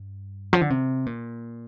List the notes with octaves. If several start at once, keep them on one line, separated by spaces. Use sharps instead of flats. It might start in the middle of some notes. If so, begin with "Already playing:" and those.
Already playing: G2
F3
D3
C3
A#2